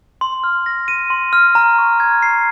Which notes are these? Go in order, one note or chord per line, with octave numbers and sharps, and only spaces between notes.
C6
F6
A#6
D#7
C6
F6
A#5
C#6
G#6
C7